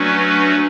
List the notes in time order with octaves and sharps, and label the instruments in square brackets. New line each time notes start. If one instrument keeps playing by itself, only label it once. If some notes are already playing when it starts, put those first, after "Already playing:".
Already playing: [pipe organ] F#3 A3 C#4 F#4 B4 [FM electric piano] D4